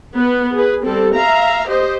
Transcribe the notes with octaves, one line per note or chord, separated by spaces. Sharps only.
B3 B4
G#4 B4
G3 C4 A4
E5 F5 A#5
G4 C5 D#5